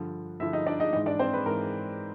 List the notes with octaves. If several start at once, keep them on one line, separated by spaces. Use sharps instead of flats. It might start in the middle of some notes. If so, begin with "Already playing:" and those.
Already playing: G2 D3 F3
G2 D3 F3 E4 E5
D#4 D#5
D4 D5
D#4 D#5
G#2 E3 D#4 D#5
D4 D5
C4 C5
B4
G#2 E3 A#4